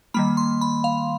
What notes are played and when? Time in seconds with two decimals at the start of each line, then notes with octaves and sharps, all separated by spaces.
0.14 D#3 G3 A#3 B5
0.37 C6
0.61 B5
0.84 F5